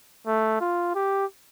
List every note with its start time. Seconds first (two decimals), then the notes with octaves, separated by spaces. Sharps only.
0.27 A3
0.61 F4
0.95 G4